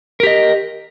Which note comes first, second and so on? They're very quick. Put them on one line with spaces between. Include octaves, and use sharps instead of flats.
A#4 G4 D#5